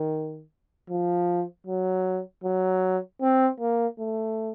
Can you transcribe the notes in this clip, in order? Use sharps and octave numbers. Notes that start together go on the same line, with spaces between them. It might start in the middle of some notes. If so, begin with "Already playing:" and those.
Already playing: D#3
F3
F#3
F#3
C4
A#3
A3